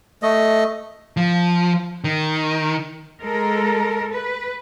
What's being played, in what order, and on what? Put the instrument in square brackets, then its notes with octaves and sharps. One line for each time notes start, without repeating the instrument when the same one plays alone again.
[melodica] A3 D#5
[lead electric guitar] F3
D#3
[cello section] G#3 A4 A#4
B4